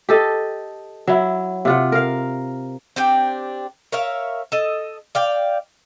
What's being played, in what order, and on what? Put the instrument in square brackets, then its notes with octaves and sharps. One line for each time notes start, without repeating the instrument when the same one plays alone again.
[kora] G4 A4 D#5
F#3 E4
C3 F4 F#5
A#4 F5
[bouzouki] C4 D4 G4 G5
A#4 C#5 E5 F5
A4 D#5
D5 F5 G5